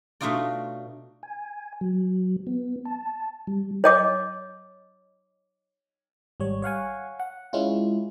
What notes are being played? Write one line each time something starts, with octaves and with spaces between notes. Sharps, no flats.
B2 A3 D4 D#4 F4 D5
G#5
F#3
B3
A5
G3
C#5 D#5 D6
G#1 G3 C#5
C#5 F5 F#5 G#5
F#5
G#3 C#4 E4 F4